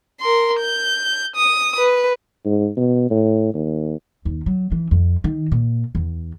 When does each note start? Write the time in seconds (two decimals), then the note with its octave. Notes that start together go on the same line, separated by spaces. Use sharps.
0.21 A#4 C6
0.59 G6
1.35 D#6
1.78 B4
2.45 G#2
2.77 B2
3.11 A2
3.54 D#2
4.25 D#2
4.46 F#3
4.72 E3
4.91 F2
5.24 D#3
5.52 A#2
5.95 E2